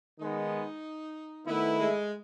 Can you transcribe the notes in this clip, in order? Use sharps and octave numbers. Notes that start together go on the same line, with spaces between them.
D#3 G#3 B3 D#4
D#3 A3 B3 E4
G#3